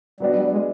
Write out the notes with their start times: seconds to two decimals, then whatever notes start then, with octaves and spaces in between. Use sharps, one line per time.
0.20 F#3 G3 B3 D4 F#4
0.36 G3
0.52 G#3